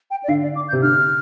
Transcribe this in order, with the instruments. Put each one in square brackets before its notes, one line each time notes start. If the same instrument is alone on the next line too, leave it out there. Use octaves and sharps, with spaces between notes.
[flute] G5
D5
[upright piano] D3 [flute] F5
[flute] D5
D6
G6
[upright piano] C3
[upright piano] D3 [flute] F6